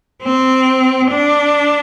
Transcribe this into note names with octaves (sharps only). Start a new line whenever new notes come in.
C4
D4